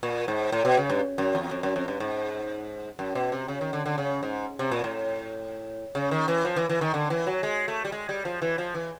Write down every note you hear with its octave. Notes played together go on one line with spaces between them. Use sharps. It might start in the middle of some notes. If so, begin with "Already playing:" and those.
A#2
G#2
A2
B2
C#3
G2
F#2
E2
F2
F#2
F2
G2
G#2
F#2
B2
C3
C#3
D#3
D3
D3
C#3
G#2
C3
A#2
A2
C#3
D#3
E3
F3
E3
E3
D#3
D3
E3
F#3
G#3
A3
G3
G#3
G3
F3
E3
F3
E3